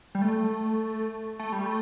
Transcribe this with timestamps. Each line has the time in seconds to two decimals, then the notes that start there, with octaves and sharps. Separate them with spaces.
0.15 G3
0.22 A3
1.39 A3
1.52 G3
1.66 A3